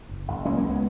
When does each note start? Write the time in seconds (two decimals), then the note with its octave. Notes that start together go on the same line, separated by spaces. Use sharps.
0.09 F#1
0.28 F#1
0.45 C#2 A#3 C#4
0.57 A#3 C#4
0.63 C#2
0.69 G#3 B3